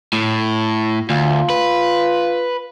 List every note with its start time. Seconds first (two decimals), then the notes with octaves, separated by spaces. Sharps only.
0.13 A2
1.10 D2 F4
1.50 B4